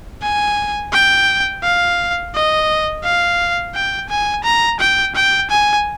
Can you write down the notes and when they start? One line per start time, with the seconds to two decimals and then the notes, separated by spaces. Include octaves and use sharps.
0.22 G#5
0.93 G5
1.63 F5
2.34 D#5
3.04 F5
3.75 G5
4.10 G#5
4.44 A#5
4.80 G5
5.15 G5
5.50 G#5